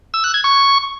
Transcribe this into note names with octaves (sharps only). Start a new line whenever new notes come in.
E6
F#6
G#6
C#6